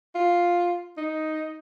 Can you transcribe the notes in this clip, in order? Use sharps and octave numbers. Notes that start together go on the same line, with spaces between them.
F4
D#4